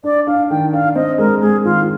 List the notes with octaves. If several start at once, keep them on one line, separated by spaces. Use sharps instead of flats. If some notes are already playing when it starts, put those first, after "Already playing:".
D4 D5
D4 F5
D#3 G5
D4 F5
C4 D#5
G#3 A#4
G#3 G#4
D#3 F4